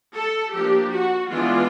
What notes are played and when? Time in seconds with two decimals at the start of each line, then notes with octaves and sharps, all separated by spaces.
0.16 A4
0.54 F3 A#3 D4 G4
0.93 F#4
1.31 E3 G#3 B3 D4 F4